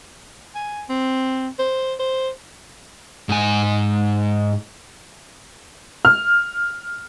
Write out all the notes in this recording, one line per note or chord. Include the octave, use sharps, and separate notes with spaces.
G#5
C4
C5
C5
G#2 G#5
F6